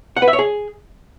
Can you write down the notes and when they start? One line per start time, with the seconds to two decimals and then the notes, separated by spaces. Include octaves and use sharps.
0.17 F#5
0.22 B4
0.28 E5
0.33 C#5
0.39 G#4